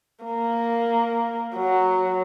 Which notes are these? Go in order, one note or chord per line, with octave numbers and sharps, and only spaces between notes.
A#3
F#3